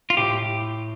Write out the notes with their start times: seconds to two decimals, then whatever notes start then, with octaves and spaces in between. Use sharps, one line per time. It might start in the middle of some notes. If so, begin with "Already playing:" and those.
0.10 F4
0.17 A2 G4